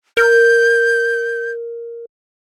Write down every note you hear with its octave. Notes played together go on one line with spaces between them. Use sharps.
A#4 G6